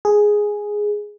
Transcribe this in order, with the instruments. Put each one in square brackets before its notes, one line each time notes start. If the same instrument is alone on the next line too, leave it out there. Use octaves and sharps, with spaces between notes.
[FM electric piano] G#4